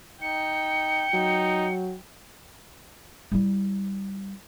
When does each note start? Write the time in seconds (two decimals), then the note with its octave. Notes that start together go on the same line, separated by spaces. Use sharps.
0.22 D#4 G5 C#7
1.13 F#3 D#4
3.32 G3 E4